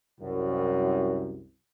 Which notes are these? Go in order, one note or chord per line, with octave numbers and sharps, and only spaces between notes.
C2 F#2